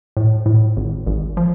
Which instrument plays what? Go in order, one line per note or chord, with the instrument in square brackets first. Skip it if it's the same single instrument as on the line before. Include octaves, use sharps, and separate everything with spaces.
[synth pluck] A2
A2
G#1
G#1
F3